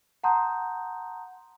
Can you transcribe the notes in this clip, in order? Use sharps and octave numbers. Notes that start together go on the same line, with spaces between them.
F#5 A5 A#5 C6 D#6 G6